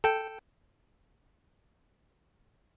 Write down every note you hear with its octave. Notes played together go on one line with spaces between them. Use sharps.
A4 G5